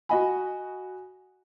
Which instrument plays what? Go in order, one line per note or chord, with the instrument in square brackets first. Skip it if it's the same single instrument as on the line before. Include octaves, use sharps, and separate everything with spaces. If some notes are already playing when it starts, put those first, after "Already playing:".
[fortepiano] F#4 D#5 B5 [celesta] F#5 G#5